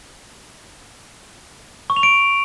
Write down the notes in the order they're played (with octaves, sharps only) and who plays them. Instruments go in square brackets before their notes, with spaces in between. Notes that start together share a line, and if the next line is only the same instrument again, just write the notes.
[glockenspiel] C#6
F7
D7